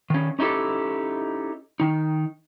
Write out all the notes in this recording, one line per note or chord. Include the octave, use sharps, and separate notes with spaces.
D#3 C#4
C#4 D#4 E4 G4 A4
D#3 D#4